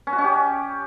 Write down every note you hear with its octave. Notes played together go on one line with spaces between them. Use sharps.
C#4
F#4
C#4
G4